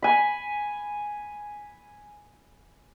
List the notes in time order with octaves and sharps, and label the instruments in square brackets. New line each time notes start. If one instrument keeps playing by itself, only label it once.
[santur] G#5 B5